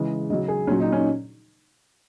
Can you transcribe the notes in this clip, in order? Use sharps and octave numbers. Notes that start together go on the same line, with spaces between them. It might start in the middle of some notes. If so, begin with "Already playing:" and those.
Already playing: C#3 E3 G#3
C#3 F#3 D#5
G#4
A#2 F#3 C#4
D#4
C#4